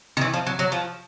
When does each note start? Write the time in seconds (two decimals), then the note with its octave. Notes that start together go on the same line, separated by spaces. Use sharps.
0.17 D#3
0.21 E3
0.34 F3
0.47 F#3
0.59 F#3
0.72 F3